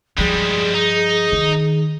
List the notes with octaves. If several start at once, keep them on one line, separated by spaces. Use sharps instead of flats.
G2 F3 G3 G#3 G#4
D#4
D#3